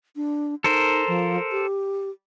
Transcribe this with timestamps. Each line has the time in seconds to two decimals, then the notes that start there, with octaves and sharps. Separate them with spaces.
0.16 D4
0.64 D#4 A4 A#4 C5
1.07 F3
1.51 G4